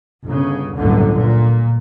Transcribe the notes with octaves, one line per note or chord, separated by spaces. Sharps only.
G1 C#3
G1 C#2 F#2 A2 D3
A#2